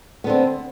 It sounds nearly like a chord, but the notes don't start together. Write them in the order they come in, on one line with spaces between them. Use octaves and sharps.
B3 D3 C4